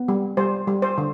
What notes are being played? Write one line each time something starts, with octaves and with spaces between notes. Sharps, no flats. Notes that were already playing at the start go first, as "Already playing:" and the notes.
Already playing: B3
G3
G3 C5
G3
C5
D3